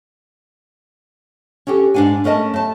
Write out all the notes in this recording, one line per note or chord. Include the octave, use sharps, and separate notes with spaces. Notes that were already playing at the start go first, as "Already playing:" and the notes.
C#4 F#4 G4 A4
G#2 A#3 D4 F#5 G#5
A3 C#4 A#4 D#5 A5
A3 A5